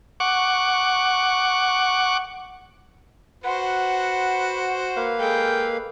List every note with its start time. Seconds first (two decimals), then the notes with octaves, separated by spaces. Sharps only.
0.20 F#5 C#6 D6
3.44 F#4 B4 C5 F#5
4.96 A#3 B4 F5
5.19 G#3 A4 G5